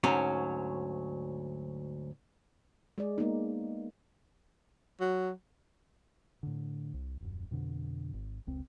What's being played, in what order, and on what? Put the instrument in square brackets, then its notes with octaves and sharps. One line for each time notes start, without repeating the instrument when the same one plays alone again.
[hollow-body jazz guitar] D2 G#2 F#3 C#4
[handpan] G#3 G#4 D5
G#3 A#3 B3 D#4
[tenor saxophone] F#3
[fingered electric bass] A2 D3
C2
D#1 F#2
F2 B2 D3
G#1
F1 C#2 C4